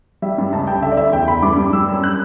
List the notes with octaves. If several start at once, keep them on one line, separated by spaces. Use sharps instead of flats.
G3 E5
G2
C#2 A5
C#2 G5
D3 E5
D5
D2 E5
E2 G5
E2 B5
G2 D6
G2
G3 E6
F#2
F#6